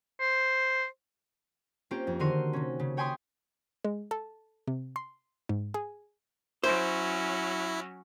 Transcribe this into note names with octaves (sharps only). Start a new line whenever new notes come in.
C5
A#3 C4 C#4 F4 G4 G5
F2
D3 D#3 F#4 A#4 C6 D#7
C3 C#4
C#3
C#5 G5 G#5 B5 C6 D#6
G#3
A4
C3
C6
G#2
G#4
F#3 C#4 E4 C5